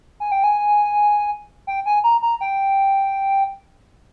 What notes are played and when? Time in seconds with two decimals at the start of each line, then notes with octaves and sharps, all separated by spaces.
0.20 G#5
0.32 G5
0.44 G#5
1.67 G5
1.86 G#5
2.04 A#5
2.22 A#5
2.41 G5